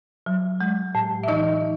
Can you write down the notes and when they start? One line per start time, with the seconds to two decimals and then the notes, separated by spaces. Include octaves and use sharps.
0.26 F#3
0.61 G#3
0.95 A2
1.23 E5
1.28 E3 D#4 D#5